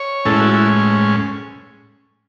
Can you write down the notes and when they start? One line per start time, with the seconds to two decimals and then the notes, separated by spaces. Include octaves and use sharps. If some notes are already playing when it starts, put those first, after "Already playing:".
Already playing: C#5
0.25 A2 G#3 C#4 E4 A4
0.40 F#4
0.54 E4